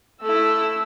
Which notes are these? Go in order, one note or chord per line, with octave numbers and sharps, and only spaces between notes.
A3 E4 E6